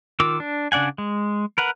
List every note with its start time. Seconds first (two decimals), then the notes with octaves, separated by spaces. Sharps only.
0.20 D#3 F4 A#4 D6 E6
0.40 D4
0.72 C#3 D4 D5 F#5 G#5
0.98 G#3
1.58 A#4 B4 F#5